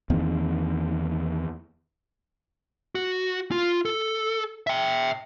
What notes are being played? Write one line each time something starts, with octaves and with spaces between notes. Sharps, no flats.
E2 D#3 A#3 C4
F#4
F4
A4
E5 G5